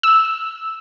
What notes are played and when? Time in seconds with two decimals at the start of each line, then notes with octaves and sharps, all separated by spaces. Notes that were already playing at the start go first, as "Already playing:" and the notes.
0.03 E6